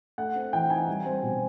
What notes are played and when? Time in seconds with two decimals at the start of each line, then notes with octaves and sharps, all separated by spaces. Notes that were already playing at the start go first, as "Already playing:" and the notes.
0.18 A3 F#5
0.36 C4
0.53 E3 G5
0.70 D#4 G#5
0.88 G3
1.05 C4
1.23 B2